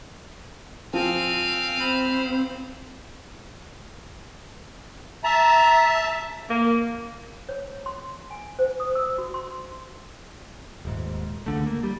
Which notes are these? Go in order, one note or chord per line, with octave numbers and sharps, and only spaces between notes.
F3 C4 F5 G#5
C4 C5 B5
E5 A5 A#5
A#3
C#5
C6
G#5
C5
D#6
E6
F#4
C6
D#1 G#2
C#2 D3 A3
A#3
G3